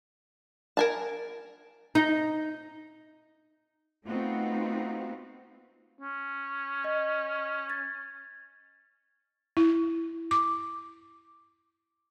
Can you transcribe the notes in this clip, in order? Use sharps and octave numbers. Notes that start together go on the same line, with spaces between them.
A#4 G#5 A5
D#4
A3 B3 C4 D#4 F4 F#4
C#4
D#5
G#6 A6
E4
D6